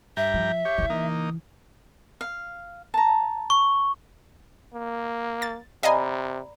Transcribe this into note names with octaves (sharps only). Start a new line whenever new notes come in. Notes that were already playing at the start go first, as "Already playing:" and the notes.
G2 E5 G5 A#5
F3
G4 C#5
C#3 E3
A#3 D#4
F5
A5 A#5
C#6
A#3
A6
C3 D5 D#5 F5 G#5 A#5 B5